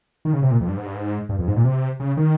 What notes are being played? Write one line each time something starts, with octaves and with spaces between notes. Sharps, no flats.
D#3
C#3
C3
A#2
F2
G2
G#2
G2
G#2
G2
F2
G#2
A#2
C3
C#3
D#3